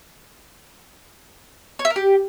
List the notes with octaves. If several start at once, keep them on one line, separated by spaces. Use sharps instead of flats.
C#5
E5
A#4
G4